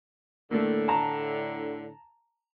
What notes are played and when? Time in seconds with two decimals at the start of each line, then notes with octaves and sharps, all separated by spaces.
0.51 A2 D3 A3 A#3
0.88 A5 A#5